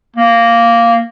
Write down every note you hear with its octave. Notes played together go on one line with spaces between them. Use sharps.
A#3